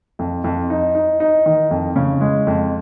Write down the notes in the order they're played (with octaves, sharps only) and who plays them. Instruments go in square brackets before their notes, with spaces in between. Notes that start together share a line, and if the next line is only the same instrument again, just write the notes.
[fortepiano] F2
F2
D#4
D#4
D#4
D#3
F2
C#3
G#3
F2